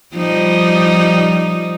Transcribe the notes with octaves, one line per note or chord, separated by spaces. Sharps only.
F3 G3 D#4